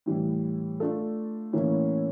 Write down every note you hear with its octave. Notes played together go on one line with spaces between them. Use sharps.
A2 E3 G3
A3 D4 F4 A4
A2 E3 A#3 C#4 E4